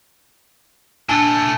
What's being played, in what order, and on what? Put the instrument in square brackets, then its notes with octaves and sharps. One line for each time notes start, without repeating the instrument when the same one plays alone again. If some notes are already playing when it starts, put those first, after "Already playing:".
[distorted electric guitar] A#2 A3 [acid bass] D4 [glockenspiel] G#5 A5 G7